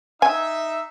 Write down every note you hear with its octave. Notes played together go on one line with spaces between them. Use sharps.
D#4 E5 G#5